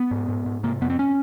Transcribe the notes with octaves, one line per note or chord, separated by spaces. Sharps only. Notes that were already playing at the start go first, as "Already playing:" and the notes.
Already playing: B3
G#2
G#2
G#2
C3 A#3
F2 B3
C4
C#4